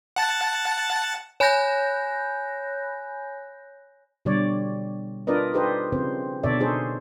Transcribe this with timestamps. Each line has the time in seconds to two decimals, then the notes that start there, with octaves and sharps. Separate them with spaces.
0.16 F#5 A5 A6
1.40 C#5 G#5 B5 F#6 G6 A#6
4.25 B2 D3 G3 C#5 D5
5.27 D4 F4 A#4 B4 D5 D#5
5.54 D#4 G4 A4 B4 C5 D#5
5.92 C#3 F3 C4 C5
6.43 B2 D3 A4 C#5 D5 E5
6.60 D#4 G#4 A4 C5